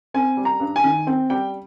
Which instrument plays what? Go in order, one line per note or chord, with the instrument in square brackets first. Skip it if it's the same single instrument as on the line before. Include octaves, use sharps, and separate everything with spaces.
[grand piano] C4 G#5
G3
A#5
G2
G#5
D#3
C4 G5
G3 G5